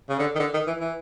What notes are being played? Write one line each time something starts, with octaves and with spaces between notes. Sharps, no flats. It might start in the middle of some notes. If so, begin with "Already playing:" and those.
C#3
D3
D#3
D3
D#3
E3
E3